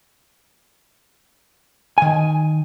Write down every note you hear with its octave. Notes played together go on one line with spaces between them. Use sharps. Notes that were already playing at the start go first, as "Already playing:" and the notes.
D#3 G#5